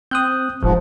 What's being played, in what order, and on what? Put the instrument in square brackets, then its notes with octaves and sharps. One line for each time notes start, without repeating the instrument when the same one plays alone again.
[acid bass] C4 [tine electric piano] D#6 F#6 G6
[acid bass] E1 [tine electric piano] A1 [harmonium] G#2 F3